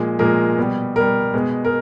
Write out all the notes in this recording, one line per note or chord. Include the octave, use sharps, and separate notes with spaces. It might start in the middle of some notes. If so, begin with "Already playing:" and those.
Already playing: A#2 F3 G#3
A#2 F3 G#3 A#4
B2 G3
B2 G3 A#4
B2 G#3
A#4